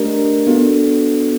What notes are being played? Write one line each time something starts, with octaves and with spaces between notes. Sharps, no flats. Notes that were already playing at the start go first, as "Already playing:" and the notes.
Already playing: A3 D4 G4 A#4 D#5
B3 D4 F#4 A4